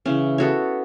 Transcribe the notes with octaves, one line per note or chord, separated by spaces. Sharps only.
C#3 E3 C#4
B3 F#4 A4 C#5